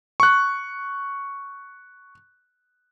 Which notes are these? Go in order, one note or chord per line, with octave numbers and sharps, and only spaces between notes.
C#6 F#6